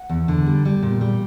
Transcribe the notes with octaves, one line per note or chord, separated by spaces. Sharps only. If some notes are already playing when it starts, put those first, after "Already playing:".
Already playing: F#5
E2
D3
G3
G3
A#2
G3